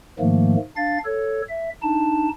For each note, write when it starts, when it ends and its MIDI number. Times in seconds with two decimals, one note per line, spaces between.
0.20 0.56 44
0.20 0.56 51
0.20 0.56 53
0.20 0.56 57
0.20 0.56 58
0.77 0.98 62
0.77 0.98 77
0.77 0.98 93
1.05 1.42 69
1.05 1.42 73
1.49 1.70 76
1.83 2.29 62
1.83 2.29 63
1.83 2.29 81